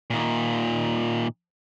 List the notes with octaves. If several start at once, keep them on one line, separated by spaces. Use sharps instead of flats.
A#2 D#3